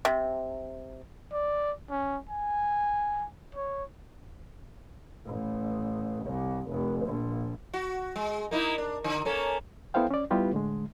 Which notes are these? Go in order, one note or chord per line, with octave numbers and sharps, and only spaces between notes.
C3
D5
C#4
G#5
C#5
A1
C2
F1
A#1
F#4
G#3
A#3 D#4 E4
D4
D3
A#3 C#4 A4
B3 E4 A4 C5 F5 G5
C#4 D5
G3 B3 E4 F4 G4 B4
A2 D3 G#3